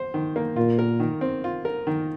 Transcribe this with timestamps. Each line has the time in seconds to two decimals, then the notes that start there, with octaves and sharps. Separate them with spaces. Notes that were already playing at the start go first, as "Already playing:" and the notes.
Already playing: C5
0.14 D#3
0.36 A#3
0.56 A#2 F4
0.79 A#4
1.00 D#3
1.21 C4
1.44 F4
1.65 A#4
1.87 D#3